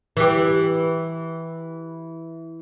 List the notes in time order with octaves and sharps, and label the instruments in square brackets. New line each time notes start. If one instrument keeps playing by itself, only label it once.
[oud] E3 G4